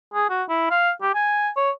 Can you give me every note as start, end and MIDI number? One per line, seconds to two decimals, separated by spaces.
0.14 0.29 68
0.30 0.43 66
0.49 0.66 64
0.70 0.91 77
1.02 1.14 67
1.15 1.49 80
1.56 1.70 73